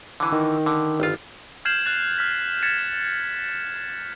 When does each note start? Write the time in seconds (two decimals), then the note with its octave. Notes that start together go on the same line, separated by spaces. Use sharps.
0.20 D3 E3
0.32 D#3
0.66 D3
1.00 G1 F4
1.65 F6 G6 G#6 C7 E7 F#7
1.85 F#6 A6 F7
2.18 F6 B6
2.62 G#6 A6 B6 C#7 E7